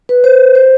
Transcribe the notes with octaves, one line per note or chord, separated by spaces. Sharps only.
B4
C5
C5